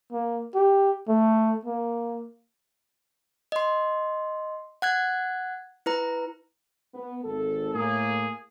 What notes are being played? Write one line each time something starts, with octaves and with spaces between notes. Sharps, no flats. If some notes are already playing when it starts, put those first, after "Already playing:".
A#3
G4
A3
A#3
D#5 C6
F#5 F#6 G#6
E4 B4 A#5
B3
G#1 A4
A2 A#3 G#4